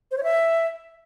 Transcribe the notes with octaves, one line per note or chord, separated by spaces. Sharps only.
C5
C#5
E5